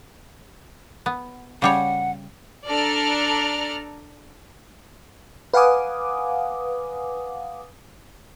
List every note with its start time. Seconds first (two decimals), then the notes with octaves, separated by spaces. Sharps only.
1.06 B3
1.62 C#3 G3 C#5 F#5
2.67 D4 A4 D5 A#5 F6
5.54 B4 F5 F#5 G#5 D6 D#6